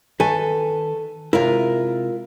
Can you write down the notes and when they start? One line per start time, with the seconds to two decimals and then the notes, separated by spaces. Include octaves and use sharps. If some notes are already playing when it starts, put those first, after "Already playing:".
0.20 D#3 A4 B4 G#5
1.33 C3 G#3 E4 F4 A#4